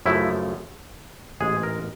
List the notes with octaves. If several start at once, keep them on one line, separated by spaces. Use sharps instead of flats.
F#2 C#3 F3 A3 E4
A1 G#2 E3 G#3 G#4
A#4